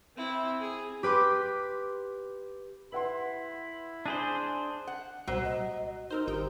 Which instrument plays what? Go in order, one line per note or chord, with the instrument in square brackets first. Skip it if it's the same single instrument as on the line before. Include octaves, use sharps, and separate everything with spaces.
[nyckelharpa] C4 E4
G#4
[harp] G4 B4 C6 D6
[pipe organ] E4 B5 [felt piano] B4 F#5 C6
[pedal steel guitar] D4 G#4 C5 [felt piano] F#6 D#7
[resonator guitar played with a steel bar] F#5
[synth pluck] C2 A#2 G3 [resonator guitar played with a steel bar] F#3 [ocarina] C5
[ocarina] D#5
[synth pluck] C4 A#4 C5 [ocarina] D#4
[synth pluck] G#1 D#4 G5 [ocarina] G4